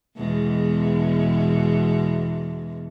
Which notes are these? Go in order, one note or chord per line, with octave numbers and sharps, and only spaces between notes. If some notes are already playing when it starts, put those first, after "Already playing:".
E2 B2 G#3